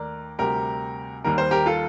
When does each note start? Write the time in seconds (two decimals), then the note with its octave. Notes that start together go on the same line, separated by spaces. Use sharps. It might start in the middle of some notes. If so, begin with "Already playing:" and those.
Already playing: D#2 D#3 A3 A#4 D5
0.39 D2 C3 G3 G4 A#4
1.24 D#2 D#3 G3 A#3 A#4
1.38 C5
1.51 G4 A#4
1.66 F4 A4